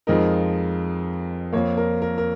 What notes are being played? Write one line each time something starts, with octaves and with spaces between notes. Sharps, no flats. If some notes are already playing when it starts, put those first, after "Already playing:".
F2 F3 G#3 D#4 A#4
F2 F3 A#3 C#5
A#4
A#4
A#4